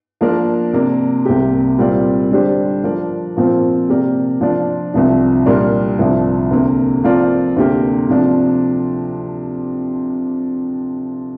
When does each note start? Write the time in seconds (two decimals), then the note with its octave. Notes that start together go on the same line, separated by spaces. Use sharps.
0.21 F3 A#3 D4 A#4 D5
0.73 C3 A#3 D4
1.25 C2 C3 A#3 G4
1.78 A#2 G3 C4 F4 D5
2.31 D3 G3 D4 G4 C5
2.84 F3 D4 A#4 D5
3.37 A#2 F3 C4 F4 C5
3.89 C3 A#3 G4 A#4 D5
4.41 F3 D4 F4 D5
4.94 C2 C3 F3 D4
5.46 A#2 G3 D4 A#4
5.99 C2 C3 F3 D4
6.51 D2 C3 A#3
7.04 F3 C4 F4 A#4 D5
7.56 D2 C3 A#3 G4 A#4
8.09 C3 F3 D4